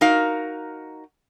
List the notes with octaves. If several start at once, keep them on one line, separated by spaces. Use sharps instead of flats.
D#4 F#4 A#4 F5